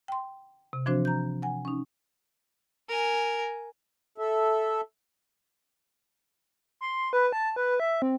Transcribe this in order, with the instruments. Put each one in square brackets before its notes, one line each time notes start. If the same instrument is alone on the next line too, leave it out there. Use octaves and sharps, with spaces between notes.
[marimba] G5 C6
C3
E3 F3 C4 D4 F#4 C5
A#5 G6
F#5 G#5
C#4 D#4
[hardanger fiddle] A#4 G#5
[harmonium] A4 E5
[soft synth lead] C6
B4
A5
B4
E5
C4